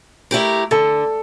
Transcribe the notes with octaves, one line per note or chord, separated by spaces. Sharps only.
A3 E4 G4 A#4
D3 A4